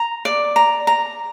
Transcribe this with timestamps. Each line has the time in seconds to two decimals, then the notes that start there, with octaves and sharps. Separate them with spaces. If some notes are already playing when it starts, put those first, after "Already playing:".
Already playing: A#5
0.25 D5
0.56 A#5
0.87 A#5